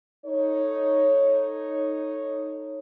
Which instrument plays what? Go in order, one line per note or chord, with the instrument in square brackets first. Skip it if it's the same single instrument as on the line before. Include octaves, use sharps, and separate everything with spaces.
[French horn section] D#4 A4 C#5